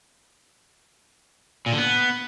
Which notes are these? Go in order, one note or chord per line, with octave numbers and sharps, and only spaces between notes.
A#2
D3
B3